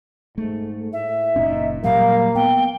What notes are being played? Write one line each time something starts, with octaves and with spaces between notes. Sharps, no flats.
G#2 A3
A2 E5
F#1 A#2 C#4 D#4
A#2 F#3 G3 A#3 F5
B3 G5